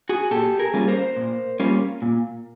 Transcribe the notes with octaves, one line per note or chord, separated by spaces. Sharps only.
F#4 G#4
A#2 G4 A4
G#4 A#4
G3 A#3 C#4 F4
A#4 C5
A#2
G3 A#3 C#4 F4
A#2